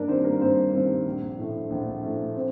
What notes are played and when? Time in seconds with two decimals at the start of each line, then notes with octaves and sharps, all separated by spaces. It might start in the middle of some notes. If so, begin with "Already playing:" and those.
Already playing: G2 A#3 D4 A#4 D5
0.08 D#3 G3 C4 C5
0.24 A#3 A#4
0.41 G2 C4 C5
0.73 D#3 G3 C4 C5
1.05 A#1
1.39 A2 A3
1.70 A#1
2.03 A2 A3
2.35 C4 C5